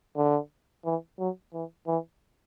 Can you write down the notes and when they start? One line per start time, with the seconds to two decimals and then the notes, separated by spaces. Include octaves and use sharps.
0.17 D3
0.85 E3
1.19 F#3
1.54 E3
1.87 E3